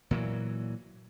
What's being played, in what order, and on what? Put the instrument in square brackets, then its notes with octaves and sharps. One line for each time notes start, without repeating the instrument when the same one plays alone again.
[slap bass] A#2 E3 F#3